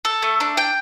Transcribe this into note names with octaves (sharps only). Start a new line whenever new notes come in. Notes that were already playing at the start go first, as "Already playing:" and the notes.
A4
A3
D4
G5